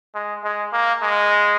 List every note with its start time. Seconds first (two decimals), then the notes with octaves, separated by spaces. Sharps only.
0.14 G#3
0.44 G#3
0.73 A#3
1.02 G#3